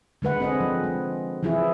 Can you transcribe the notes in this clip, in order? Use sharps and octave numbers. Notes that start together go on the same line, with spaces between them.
D3 G#3 B4 F#5
C4 G#4 D#5
F3
G#3
E3 F3 E4 F4 G#4